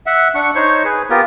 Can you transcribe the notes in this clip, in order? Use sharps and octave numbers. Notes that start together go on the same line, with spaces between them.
E5 F#5
D4 F#5 C#6
D#4 C5 C#5 C#6
G#4 B4
B3 F4 G4 A#4